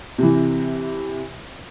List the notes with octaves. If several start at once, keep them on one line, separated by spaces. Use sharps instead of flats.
C3 E3